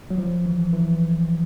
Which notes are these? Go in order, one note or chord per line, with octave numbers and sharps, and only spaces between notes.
F#3
F3
E3
E3